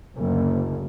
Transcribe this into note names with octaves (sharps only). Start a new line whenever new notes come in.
F#1 D2